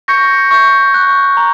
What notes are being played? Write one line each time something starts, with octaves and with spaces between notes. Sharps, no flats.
C#6 G6 A#6 C#7
C#6 G6
C#6 F#6
A#5